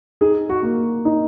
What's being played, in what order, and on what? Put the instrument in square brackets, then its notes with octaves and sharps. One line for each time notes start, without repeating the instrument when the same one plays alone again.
[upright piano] D#4 [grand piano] G#4
[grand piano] F#4
[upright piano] A#3
D#4